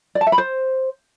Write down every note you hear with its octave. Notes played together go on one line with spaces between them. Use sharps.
D5
A5
E5
B5
C5